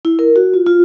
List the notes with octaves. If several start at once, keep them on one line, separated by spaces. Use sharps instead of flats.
E4
A#4
F#4
F4
F4